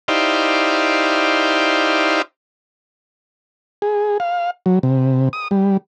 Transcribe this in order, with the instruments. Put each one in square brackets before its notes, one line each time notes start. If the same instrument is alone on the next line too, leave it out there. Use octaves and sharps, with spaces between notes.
[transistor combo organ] D#4 E4 G4 C5 D5 F5
G#4
F5
F#3
C3
D#6
G3